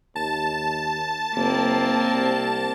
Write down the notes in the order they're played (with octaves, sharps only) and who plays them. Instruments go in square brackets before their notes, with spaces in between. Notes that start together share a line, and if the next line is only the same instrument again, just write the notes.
[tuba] D#2 [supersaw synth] A5
[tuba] F#1 [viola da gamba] A#3 C4
[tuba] C2